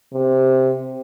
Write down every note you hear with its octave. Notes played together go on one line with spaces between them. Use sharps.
C3